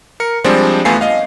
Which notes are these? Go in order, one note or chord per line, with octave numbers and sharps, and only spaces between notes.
A#4 C#7
F3 G3 G#3 C4 D4 C5
E2 A3 B3 F4 G#5 C7
D#5 F5